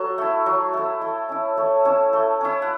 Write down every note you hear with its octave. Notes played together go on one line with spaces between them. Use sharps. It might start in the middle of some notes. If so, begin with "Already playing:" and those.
Already playing: F#3 A4
A3 E4
F#3
A3 E4
A3
C#4 E4
A3 C#5
C#4 E4 A5
A3
C#4 E4
F#5